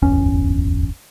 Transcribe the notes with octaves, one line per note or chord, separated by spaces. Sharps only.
D1 G1 E2 C#4